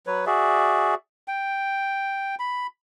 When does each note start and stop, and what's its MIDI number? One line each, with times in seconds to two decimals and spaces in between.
0.07 0.25 54
0.07 0.25 71
0.07 0.25 73
0.26 0.95 66
0.26 0.95 68
0.26 0.95 74
0.26 0.95 76
1.28 2.35 79
2.39 2.67 83